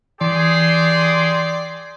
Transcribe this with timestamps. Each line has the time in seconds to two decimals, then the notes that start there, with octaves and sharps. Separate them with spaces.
0.21 E3 G4 G#4 D5 C6